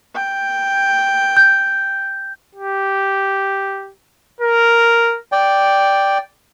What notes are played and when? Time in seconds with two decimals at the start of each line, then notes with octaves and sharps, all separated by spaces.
0.15 G5
1.37 G6
2.55 G4
4.41 A#4
5.32 D5 G5